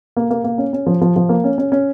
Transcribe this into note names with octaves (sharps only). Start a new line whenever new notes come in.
A#3
A#3
A#3
C#4
C#4
F3
F3
F3
A#3
C#4
C#4
C#4